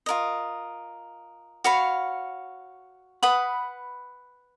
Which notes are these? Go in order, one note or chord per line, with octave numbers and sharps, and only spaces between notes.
F4 A#4 D#5
F#4 C#5 F5 B5
B4 F#5 B5 D#6